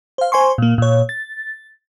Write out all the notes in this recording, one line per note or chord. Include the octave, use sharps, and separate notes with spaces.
C5 F5
C5 G#5 C6 C#6
A#2 A#3
A#2 C#5
A6